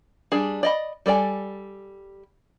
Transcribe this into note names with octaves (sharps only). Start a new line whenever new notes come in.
G3 D4 G#4
D5 D#5 B5
G3 A4 D5 G#5